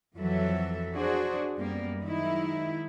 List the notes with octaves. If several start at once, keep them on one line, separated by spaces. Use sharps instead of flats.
F2 E3 F#3 A4 E5
D4 F#4 G#4 C5
F#2 G3 A#3 B3
D#3 F#3 G#3 D#4 E4